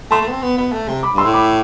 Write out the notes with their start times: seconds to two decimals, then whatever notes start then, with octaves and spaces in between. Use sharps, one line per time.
0.11 A3 A5 C6
0.22 A3
0.28 B3
0.32 C4
0.42 B3
0.58 B3
0.72 A3
0.88 C3
1.03 B5 D6
1.13 G2
1.18 C6 E6
1.24 A2
1.34 B5 D6